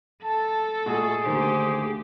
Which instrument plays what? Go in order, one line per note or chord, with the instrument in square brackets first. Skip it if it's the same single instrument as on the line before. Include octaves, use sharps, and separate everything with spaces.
[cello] A4 [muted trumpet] A5
[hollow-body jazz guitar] A#2 G#3 F#4 [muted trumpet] A3 [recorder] G#4
[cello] D2 G4 [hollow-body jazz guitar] D3 D#3 A#3 [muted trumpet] C5